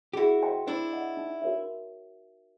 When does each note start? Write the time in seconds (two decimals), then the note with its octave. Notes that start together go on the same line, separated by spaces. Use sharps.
0.13 G4
0.17 E4 F#4 G#4
0.43 C5 D#5 G5 C6
0.67 D4 E4 C5
0.93 D#5 F#5
1.17 D#4
1.42 F#4 A#4 C#5 E5